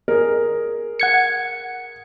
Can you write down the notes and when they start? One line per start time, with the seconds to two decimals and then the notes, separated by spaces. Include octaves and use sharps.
0.08 G#4 A#4
1.00 F#5 G#6 C#7